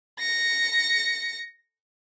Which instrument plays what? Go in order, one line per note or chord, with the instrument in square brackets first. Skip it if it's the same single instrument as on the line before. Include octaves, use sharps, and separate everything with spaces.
[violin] A#6 C#7